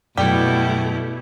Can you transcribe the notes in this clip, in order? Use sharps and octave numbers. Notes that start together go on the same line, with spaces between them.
F#2 B2 G3 A3 E4